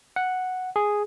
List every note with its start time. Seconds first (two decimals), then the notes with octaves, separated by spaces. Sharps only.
0.16 F#5
0.76 G#4